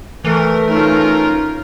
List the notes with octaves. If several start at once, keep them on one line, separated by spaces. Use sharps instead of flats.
E3 A3 A#4
C#4 D#4 F4 A#4